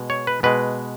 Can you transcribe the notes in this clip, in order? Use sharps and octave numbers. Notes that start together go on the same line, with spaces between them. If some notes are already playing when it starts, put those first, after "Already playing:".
Already playing: B2 G#3
C#5
B4
B2 G#3 B4